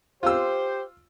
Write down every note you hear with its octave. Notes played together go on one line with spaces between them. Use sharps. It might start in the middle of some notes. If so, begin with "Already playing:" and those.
F4 G4 C5 E6